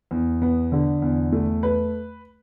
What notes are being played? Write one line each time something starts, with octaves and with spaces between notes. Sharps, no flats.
E2
B3
D3
E2
A3
B4